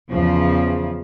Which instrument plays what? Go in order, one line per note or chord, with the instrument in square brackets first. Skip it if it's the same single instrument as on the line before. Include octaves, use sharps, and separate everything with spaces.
[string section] E2 C#3 F3